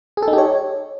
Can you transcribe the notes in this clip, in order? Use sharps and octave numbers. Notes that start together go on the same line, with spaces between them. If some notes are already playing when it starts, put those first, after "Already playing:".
G#4
A4
D#4
G4
C#5